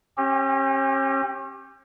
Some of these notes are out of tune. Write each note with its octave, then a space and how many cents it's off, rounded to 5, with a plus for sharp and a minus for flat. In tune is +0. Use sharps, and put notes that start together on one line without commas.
C#4 -40 G4 +0